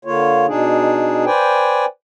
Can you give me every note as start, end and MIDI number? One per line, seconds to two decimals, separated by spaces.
0.05 0.46 50
0.05 0.46 58
0.05 0.46 65
0.05 0.46 73
0.47 1.25 47
0.47 1.25 62
0.47 1.25 63
0.47 1.25 68
1.26 1.85 71
1.26 1.85 72
1.26 1.85 74
1.26 1.85 79
1.26 1.85 80